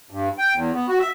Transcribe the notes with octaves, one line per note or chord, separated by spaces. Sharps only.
G2
G5
E2
B3
F#4
E5